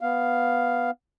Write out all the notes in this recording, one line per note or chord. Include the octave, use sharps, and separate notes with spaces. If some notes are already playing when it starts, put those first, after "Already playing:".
B3 F5